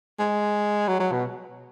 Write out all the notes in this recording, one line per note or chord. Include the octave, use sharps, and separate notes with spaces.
G#3
F#3
F#3
B2